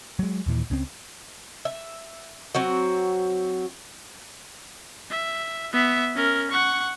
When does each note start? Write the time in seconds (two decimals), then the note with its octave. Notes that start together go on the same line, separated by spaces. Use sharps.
0.19 F#3 G#3
0.46 D#2 A#2 E3
0.70 C#2 C#3 F3 C4
1.65 E5
2.55 F#3 C4 F#4
5.10 E5
5.73 B3 E5
6.16 C#4 A#4
6.51 F#5 C#6